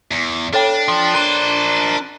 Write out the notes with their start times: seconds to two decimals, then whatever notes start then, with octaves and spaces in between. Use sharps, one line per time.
0.11 E2
0.54 D4 A4 C#5 G5
0.88 F3
1.14 A#4 C5 F#6 D#7